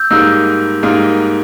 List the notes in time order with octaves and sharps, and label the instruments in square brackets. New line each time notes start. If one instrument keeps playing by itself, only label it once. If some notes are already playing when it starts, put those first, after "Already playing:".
Already playing: [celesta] E6 G6
[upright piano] G#2 G3 A#3 D#4 [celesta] E6
[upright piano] G#2 G3 A#3 D#4